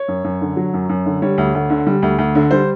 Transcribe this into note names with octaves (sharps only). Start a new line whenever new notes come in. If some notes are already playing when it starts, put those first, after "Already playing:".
Already playing: C#5
F#2
F#2
D3
F#3
F#2
F#2
D3
G3 C#5
D2
D2
D3
G3
D2
D2
D3
G3 C5